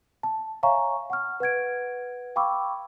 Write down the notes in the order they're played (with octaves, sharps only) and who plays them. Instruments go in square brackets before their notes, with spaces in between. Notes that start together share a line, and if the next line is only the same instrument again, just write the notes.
[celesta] A5
C#5 E5 F5 G#5 A#5 C#6
F#5 C#6 F6
B4 F#5 G#6 D7
F5 G5 B5 C#6 D6 E6